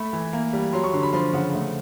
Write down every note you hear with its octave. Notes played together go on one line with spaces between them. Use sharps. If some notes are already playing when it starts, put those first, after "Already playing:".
Already playing: A3 B5
E3
A#3
G3
F#3 C6
C#6
D3 C6
B5
F3 C6
C#3 F#5
A3